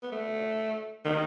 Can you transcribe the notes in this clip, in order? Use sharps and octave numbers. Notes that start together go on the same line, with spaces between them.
B3
A3
D#3